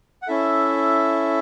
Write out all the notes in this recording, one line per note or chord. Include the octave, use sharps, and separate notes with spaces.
F#5
C#4 E4 A4 E5